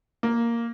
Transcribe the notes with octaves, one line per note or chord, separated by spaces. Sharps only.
A#3